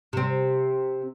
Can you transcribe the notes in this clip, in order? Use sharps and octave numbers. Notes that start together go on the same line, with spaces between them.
C3 C4